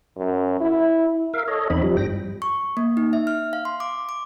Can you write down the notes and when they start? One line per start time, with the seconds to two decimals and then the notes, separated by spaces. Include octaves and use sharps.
0.17 F#2
0.60 E4
1.34 A#4 E5 F5
1.48 A4 C#5 D#5
1.70 E2 C4 D#4 B5
1.83 F3 G3
1.97 G2 G5 A#6
2.42 C#6
2.77 A#3
2.97 D#4
3.13 E5
3.27 F6
3.53 F5
3.65 C6
3.80 D6
4.09 D6